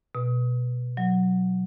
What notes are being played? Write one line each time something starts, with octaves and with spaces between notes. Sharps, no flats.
B2
F#3